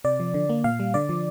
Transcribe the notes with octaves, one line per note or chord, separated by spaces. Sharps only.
C3 D5
F3
D3
A#3
A#2 F5
G3
D3 D5
F3